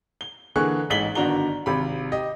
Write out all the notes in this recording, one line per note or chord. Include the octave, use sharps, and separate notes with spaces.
G7
D3 E3 A#3 G#4 C#6 F#6
A1 G#2 B6 F#7 G7
G1 D#3 D4 F#4 A#5 G7
G#1 C3 B5
G4 D#5